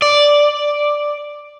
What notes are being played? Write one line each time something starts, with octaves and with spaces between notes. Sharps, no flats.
D5